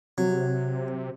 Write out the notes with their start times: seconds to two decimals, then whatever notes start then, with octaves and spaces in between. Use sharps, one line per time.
0.18 C3 F#3